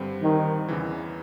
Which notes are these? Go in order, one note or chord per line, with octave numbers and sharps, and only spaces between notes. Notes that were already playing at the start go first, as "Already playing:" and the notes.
Already playing: G2 D3 G3 C4
D#3
E2 C#3 E3